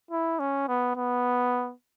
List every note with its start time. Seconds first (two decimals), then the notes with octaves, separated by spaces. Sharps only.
0.11 E4
0.40 C#4
0.68 B3
0.96 B3